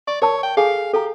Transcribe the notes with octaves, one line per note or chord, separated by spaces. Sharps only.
D5 C#6
A#4 C#5 A5 E6
G5
G#4 A4 F5 G#5
G4 A4 A#5